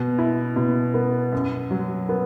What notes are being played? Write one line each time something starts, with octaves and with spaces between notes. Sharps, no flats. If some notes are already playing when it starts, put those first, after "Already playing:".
Already playing: B2
E4
B2
B3
F#2
F#3
B3